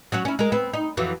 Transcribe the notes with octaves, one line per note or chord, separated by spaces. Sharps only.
F#3 C#4 F#4
C#4 E4
G#3 A#4
B3 C4
D#4
F2 E3 F#3